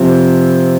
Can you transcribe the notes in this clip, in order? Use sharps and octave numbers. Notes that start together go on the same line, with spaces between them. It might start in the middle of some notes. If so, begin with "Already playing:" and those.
Already playing: C3 F3 C4